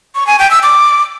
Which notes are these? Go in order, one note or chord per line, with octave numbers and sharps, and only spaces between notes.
C#6
G#5
G5
E6
D6